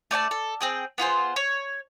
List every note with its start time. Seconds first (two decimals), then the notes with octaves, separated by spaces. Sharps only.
0.11 A3 D5 G5 A5
0.31 A4
0.61 C4 G#4 G5
0.98 B3 F4 G#4 C5
1.36 C#5